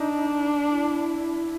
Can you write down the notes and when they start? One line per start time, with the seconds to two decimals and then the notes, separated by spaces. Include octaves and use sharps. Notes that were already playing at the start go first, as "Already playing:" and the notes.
Already playing: D4 D#4
0.68 E4